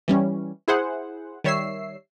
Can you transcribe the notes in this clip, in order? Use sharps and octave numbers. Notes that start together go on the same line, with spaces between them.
E3 G3 C#4
E4 G#4 C5 F#5
D#3 G3 C#5 E5 E6 C7